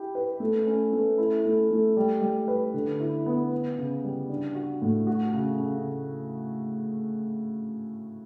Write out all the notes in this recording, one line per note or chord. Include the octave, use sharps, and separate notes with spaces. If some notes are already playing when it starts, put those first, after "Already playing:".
Already playing: E4 G4
B4
A3
C#4
A3
E4
A3
A3
G3
G3
B4
D3
E4
B3
B3
C#3
G3
D4
F#4
A2
F#4
C#3
C#3